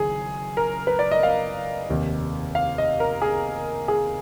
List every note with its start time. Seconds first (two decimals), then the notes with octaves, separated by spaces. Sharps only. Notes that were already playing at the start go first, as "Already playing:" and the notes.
Already playing: F#1 F#2 D#3 G#4
0.57 A#4
0.87 B4
0.99 D5
1.11 D#5
1.23 F5
1.90 F1 D#2 D#3
2.55 F5
2.78 D#5
3.00 A#4
3.22 G#4
3.88 G#4